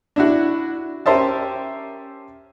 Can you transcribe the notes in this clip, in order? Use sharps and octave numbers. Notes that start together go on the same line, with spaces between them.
D4 E4 F#4
C#4 G4 A#4 C5 E5 A5